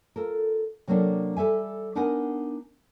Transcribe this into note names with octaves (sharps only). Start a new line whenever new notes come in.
F4 A4 A#4
C3 F#3 A#3 C#4 D4 A4
G3 A4 E5 G#5
B3 D4 D#4 A#4 F#5 G#5